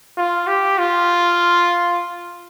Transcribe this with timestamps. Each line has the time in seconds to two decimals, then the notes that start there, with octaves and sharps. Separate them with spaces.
0.17 F4
0.47 G4
0.78 F4